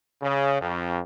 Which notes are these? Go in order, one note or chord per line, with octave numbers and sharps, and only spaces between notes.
C#3
F2